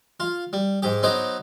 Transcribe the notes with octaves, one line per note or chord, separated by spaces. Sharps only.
F4
G3
G#2 G4
F#3 B3 D#4 C5 D6